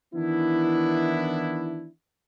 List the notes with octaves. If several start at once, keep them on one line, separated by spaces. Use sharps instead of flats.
D#3 E3 B3 D4 E4